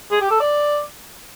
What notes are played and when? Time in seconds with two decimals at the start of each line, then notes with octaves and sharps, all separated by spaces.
0.12 G#4
0.21 G4
0.31 A4
0.40 D5